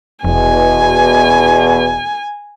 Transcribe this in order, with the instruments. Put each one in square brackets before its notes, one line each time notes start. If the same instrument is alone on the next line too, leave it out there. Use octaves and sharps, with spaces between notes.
[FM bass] F1 [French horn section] E2 B2 [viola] G#5